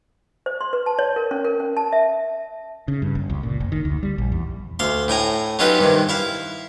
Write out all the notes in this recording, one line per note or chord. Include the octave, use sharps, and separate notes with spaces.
C5
C6
B4
A5
C#5
A#4
C#4
A#4
C#4
A5
E5
C#3
G2
F#1
C#2
A#2
F#1
D#3
D2
G3
A#1
E2
D2 F5 C6
A2 G5 G#5 A#5
F#3 C#4 D#4 F4 G4 B4
G2 C3 D#3
E4 E5 F5